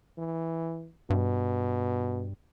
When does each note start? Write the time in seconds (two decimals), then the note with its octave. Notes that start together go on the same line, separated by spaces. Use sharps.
0.19 E3
1.10 G2 B2